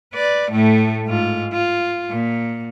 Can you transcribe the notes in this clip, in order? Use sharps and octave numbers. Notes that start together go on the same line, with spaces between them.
B4 D5
A2 A3
G#2 F4
F4
A#2